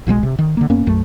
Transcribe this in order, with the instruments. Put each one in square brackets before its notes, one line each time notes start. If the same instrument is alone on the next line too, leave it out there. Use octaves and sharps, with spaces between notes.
[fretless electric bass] B1 B2 F3 G#3
C3
D#3
D3 F3 A#3
F#2 A#3 B3 C#4
B1 F#2 F#3 A3